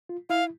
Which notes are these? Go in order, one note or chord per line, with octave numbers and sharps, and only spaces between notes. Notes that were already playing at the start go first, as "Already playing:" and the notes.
F4
E4 F5